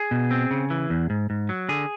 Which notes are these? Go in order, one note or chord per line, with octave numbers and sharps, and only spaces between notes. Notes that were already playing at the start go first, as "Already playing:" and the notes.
Already playing: G#4
B2
C4
C#3
E3
E2
G#2
G#2
F#3
D3 G#4